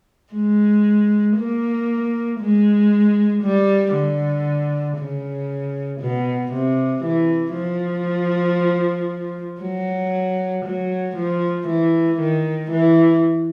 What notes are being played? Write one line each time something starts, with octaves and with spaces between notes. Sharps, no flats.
G#3
A#3
G#3
G3
D3
C#3
B2
C3
E3
F3
F#3
F#3
F3
E3
D#3
E3